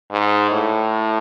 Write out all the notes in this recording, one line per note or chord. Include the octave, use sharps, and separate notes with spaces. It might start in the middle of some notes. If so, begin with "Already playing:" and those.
G#2
A2